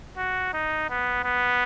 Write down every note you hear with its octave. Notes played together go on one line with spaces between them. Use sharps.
F#4
D#4
B3
B3